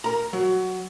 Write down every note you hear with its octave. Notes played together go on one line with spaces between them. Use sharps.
A#4 A#5
F#3